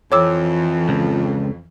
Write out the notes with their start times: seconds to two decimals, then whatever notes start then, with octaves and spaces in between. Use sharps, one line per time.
0.12 F2 E3 C#5 D6 E6
0.89 C#2